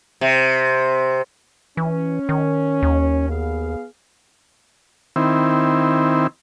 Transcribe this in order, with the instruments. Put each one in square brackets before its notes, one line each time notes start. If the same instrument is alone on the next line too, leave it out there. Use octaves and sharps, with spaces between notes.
[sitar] C3
[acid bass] E3 [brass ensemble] C#4
[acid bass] D#3
D#2
[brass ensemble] B3 G#4 F5
[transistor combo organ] D#3 C4 E4